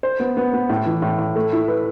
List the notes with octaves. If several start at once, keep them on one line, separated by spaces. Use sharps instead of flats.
C5
B3
B3
B3
A2
E3
A2
A2
A3
E4
B4